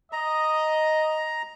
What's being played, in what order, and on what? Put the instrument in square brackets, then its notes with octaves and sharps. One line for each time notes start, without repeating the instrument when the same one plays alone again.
[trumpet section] D#5 [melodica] A#5